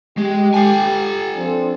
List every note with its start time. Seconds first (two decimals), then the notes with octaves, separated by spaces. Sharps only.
0.18 G#3 G4
0.54 A4 G#5
1.34 F3 C4 D4